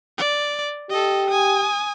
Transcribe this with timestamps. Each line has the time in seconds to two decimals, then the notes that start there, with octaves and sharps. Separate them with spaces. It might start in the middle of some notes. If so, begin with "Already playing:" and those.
0.18 D5
0.90 G4 A4 D#5
1.30 G#5 D#6